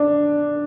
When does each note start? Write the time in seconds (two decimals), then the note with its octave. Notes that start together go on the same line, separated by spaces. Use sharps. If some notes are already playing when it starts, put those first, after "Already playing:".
Already playing: D4